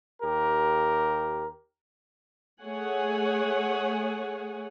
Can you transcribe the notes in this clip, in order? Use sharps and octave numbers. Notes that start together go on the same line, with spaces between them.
D#2 G4 A#4
A3 G#4 C#5 F#5 G#5